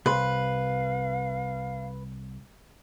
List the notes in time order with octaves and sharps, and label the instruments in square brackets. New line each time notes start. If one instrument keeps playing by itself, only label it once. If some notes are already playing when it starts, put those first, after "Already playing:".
[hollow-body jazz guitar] C2 C6 [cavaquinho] B4 [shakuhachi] F5